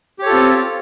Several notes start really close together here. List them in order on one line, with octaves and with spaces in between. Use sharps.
G4 C#5 A4 F4 C4